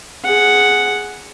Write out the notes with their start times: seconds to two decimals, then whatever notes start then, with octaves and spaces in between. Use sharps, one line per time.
0.24 G#4 F#5